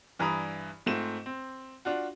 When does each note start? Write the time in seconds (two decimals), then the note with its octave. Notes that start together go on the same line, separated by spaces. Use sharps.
0.19 G2 E3 D4 A#5 B5 D#6
0.86 G#2 A3 C4 F4 E7
1.26 C4
1.85 D4 F4 F#4